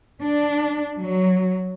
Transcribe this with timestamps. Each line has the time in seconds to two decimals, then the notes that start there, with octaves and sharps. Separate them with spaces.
0.21 D4
0.98 F#3